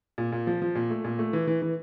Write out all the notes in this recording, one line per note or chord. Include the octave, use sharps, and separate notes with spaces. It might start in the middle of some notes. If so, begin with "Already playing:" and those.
A#2
A#2
F3
F3
A#2
A3
A#2
A3
E3
E3
E3